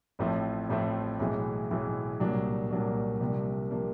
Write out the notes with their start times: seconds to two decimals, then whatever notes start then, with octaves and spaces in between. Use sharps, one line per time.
0.19 A1 A2 F3 A3 C4
0.69 A1 A2 F3 A3 C4
1.19 B1 A2 E3 G#3
1.70 B1 A2 E3 G#3
2.20 C2 A#2 F#3 A#3 D4
2.71 C2 A#2 F#3 A#3 D4
3.20 C2 C3 F3 A#3 D4
3.71 C3 F3 A#3 D4